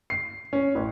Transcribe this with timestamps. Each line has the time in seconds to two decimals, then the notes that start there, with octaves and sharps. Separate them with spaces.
0.10 C7
0.53 C#4
0.75 A1